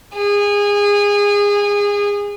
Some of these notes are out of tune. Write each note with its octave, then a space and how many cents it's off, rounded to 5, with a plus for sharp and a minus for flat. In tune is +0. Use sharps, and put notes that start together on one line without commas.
G#4 -25